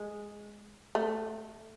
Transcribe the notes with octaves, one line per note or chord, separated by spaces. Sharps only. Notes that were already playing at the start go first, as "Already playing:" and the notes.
Already playing: G#3
A3